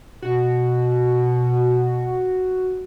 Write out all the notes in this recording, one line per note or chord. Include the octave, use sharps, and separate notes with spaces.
B2 F#4